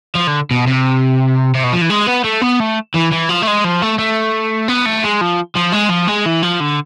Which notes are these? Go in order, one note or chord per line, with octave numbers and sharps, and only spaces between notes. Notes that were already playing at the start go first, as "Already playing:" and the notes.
F3
D3
B2
C3
C3
B2
F3
E3
G#3
B3
A3
B3
A3
E3
E3
F3
A3
G#3
F3
A3
A3
B3
A3
G#3
F3
F3
G#3
F3
G#3
E3
F3
D3